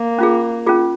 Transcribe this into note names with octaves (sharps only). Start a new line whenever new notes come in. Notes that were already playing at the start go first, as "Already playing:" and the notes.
Already playing: A#3
C#4 F4 G#4
C#4 F4 G#4